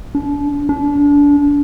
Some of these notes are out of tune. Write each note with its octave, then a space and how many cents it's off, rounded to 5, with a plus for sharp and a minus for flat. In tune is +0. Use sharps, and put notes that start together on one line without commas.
D4 -35
D4 -30